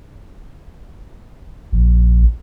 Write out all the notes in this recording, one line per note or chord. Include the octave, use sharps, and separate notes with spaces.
A#1